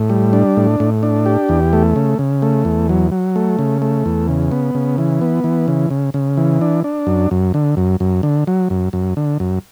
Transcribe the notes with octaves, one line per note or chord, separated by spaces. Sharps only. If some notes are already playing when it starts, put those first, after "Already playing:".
Already playing: A2
G3
D4
A2
A2
D4
G4
E2
A3
C#3
C#3
A3
E2
F#3
F#3
A3
C#3
A3
E2
C#3
B3
C#3
E3
B3
E3
C#3
C#3
C#3
E3
D4
D4
F#2
F#2
D3
F#2
F#2
D3
F#3
F#2
F#2
D3
F#2